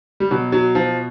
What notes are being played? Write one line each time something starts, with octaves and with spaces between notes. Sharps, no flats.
G3
B2 F#3
F#3
F3